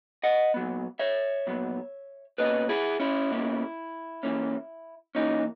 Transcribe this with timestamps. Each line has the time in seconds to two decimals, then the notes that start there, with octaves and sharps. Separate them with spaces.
0.24 D#5 F#5
0.54 A#2 F#3 B3
0.99 C#5 E5
1.47 A#2 F#3 B3
2.38 B2 A#3 C#4 B4 D#5
2.69 E4 G#4
3.00 C#4 E4
3.31 B2 A#3 C#4
4.23 E3 A#3 C#4
5.15 E3 A#3 C#4 D#4